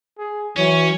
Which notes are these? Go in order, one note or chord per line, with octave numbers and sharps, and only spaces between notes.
G#4
E3 F#3 C#4 C#5